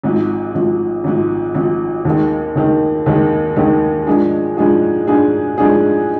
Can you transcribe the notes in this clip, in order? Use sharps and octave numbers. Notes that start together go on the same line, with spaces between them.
G#1 G#2 F3
G#1 G#2 F3
G#1 G#2 F3
G#1 G#2 F3
D#2 D#3 G#3
D#2 D#3 G#3
D#2 D#3 G#3
D#2 D#3 G#3
G#2 F3 G#3 D4 G#4
G#2 F3 G#3 D4 G#4
G#2 F3 G#3 D4 G#4
G#2 F3 G#3 D4 G#4